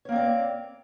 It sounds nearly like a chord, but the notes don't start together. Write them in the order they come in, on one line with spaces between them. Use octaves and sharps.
C#5 A#3 C4 D5